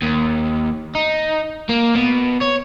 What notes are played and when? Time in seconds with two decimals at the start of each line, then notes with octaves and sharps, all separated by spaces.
0.02 D#2
0.95 D#4
1.69 A#3
1.96 B2
2.41 C#5